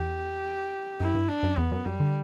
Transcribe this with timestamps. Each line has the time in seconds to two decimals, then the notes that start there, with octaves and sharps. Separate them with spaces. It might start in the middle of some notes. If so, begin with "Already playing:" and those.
Already playing: E2 G4
1.00 F#2 E4
1.15 G2
1.29 D4
1.43 F#2
1.57 E2 B3
1.71 F#2
1.86 F#2 G3
2.00 D3